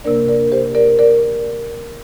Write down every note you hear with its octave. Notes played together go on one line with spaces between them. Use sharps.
C3 A#3 D4 A#4 D5
A#4 D5
G4 C5
A#4 D5
A#4 D5